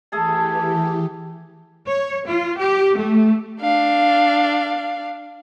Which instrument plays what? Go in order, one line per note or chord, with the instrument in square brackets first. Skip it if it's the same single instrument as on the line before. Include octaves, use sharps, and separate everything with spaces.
[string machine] E3 G4 [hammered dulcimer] A3 G#4 A5
[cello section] C#5
F4
G4
A3
[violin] D4 F5